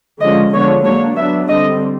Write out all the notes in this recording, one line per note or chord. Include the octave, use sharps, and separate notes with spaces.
D3 F3 G#3 C#4 D#5
D3 F3 G#3 B3 D4 C#5
F#3 A#3 D4 C#5
F#3 B3 D4 E5
D3 G3 C4 D#5